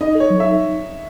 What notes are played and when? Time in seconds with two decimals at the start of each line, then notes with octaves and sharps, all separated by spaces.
0.01 D#4 D#5
0.15 A4
0.20 C#5
0.30 F#3
0.40 E5
0.44 D#4